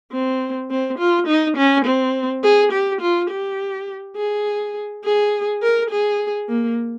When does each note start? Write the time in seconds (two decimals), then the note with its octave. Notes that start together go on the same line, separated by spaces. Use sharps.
0.12 C4
0.70 C4
0.99 F4
1.27 D#4
1.57 C#4
1.85 C4
2.43 G#4
2.72 G4
3.01 F4
3.30 G4
4.17 G#4
5.04 G#4
5.63 A#4
5.91 G#4
6.49 A#3